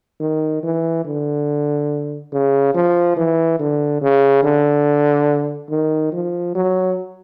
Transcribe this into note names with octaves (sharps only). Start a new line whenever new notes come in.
D#3
E3
D3
C#3
F3
E3
D3
C#3
D3
D#3
F3
F#3